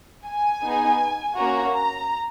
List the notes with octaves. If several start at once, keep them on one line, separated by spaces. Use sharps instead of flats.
G#5
B3 D#4 G#4
A#3 C#4 F#4 A#5
A#5